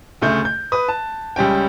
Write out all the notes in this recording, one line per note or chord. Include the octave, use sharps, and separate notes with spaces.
D2 C#3 A3 G6
G6
B4 D#6
A5
C#2 G3 C#4 G5